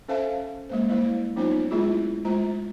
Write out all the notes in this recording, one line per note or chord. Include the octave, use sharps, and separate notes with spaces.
C#4 A4 C5 E5 F5 A5
G#3 A#3 C5
G3 A#3 E4 C5
F#3 B3 C#4 D#4 F4 C5
G#3 A3 E4 F4 G#4
G#3 A3 F4 C5 A#5